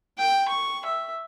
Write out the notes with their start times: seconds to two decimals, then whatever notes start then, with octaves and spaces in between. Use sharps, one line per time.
0.19 G5
0.48 C#6
0.85 E5